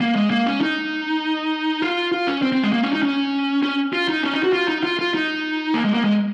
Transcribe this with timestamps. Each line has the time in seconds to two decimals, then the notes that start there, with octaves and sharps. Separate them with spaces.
0.01 A#3
0.16 G#3
0.30 A#3
0.46 C#4
0.61 D#4
1.82 F4
2.12 F4
2.27 C#4
2.42 C4
2.52 C4
2.63 G#3
2.73 A#3
2.83 C#4
2.93 D#4
3.03 C#4
3.63 C#4
3.93 F4
4.09 D#4
4.23 C#4
4.33 D#4
4.43 F#4
4.53 F4
4.68 D#4
4.83 F4
4.99 F4
5.14 D#4
5.74 A#3
5.85 G#3
5.94 A#3
6.04 G#3